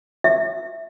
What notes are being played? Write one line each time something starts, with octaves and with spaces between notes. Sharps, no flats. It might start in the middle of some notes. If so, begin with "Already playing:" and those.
E5